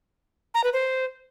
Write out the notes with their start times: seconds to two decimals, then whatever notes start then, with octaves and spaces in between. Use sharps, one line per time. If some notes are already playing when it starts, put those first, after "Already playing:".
0.54 A#5
0.64 B4
0.73 C5